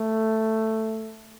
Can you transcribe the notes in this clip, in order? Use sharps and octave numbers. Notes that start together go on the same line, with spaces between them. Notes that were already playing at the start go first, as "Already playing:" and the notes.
Already playing: A3